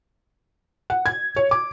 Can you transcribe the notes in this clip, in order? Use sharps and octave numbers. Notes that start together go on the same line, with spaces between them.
F#5
G#6
C#5
D6